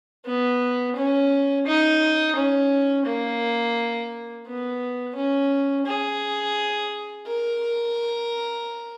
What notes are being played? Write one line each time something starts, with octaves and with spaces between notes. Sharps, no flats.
B3
C#4
D#4
C#4
A#3
B3
C#4
G#4
A#4